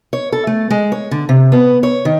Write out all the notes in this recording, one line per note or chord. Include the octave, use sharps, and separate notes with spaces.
C#5
A4
A3
G#3
C#5
D3
C3
B3
C#5
D#3